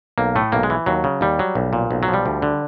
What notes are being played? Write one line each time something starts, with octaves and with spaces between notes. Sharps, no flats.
B1 A#3
A2 A3
B1 A#3
G#3
E3
D#2 F#3
C#3
D#2 G3
F#3
B1
A#2
B1
F#3
F3
G3
D2
D3